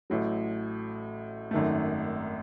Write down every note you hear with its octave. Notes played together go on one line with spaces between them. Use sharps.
A1 A2 F#3
G#1 F#2 D#3 A3